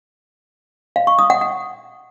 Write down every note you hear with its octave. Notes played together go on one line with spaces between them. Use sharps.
F5
C#6
D#6
F#5
F#5